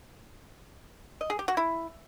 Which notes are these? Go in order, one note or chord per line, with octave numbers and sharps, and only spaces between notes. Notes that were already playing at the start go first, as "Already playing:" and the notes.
D#5
G#4
G4
F#4
E4